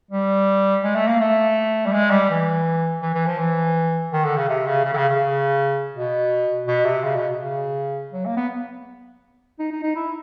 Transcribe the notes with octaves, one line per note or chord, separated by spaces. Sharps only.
G3
G#3
A3
A#3
A3
G3
G#3
G3
E3
E3
E3
F3
E3
D#3
D3
C#3
C3
C#3
C#3
D3
C#3
C#3
B2
B2
C3
C#3
B2
C#3
F#3
A#3
B3
D#4
D#4
D#4
E4